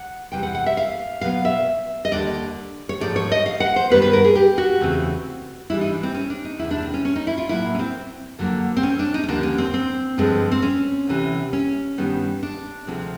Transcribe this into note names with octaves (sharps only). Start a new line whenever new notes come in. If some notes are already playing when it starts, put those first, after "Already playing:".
Already playing: F#5
E2 C3 E3 G3 G5
F#5
F#5
E5
F5
B2 F#3 B3 F5
E5
D#5
D#2 D3 G3 D5
C#5
G#2 F3 A3 D5
C#5
D#5
F5
F#5
C5
G2 D#3 G3 B3 B4
B4
A#4
G#4
G4
F#4
E2 C#3 E3 A3 C4
G#2 E3 G3 E4
D#4
D4
C4
C#4
D4
D#4
E2 C3 D#3 E4
D4
C4
C#4
C#4
D#4
E4
F4
A2 F#3 A#3 E4
C#4
C4
F2 D3 F#3 A#3
C4
C#4
D4
D#4
C#4
D#2 D3 F3 A#3 D4
C#4
C4
C4
G2 D3 F3 G#3 C4
C4
C#4
D2 C3 E3
C#4
G2 D#3 G3 B3
D4
D2 C3 F3 G#3 C4